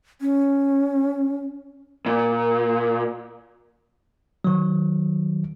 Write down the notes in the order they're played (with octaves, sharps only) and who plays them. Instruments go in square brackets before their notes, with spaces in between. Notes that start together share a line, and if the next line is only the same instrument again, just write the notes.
[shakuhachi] C#4
[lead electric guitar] A#2
[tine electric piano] D#3 F#3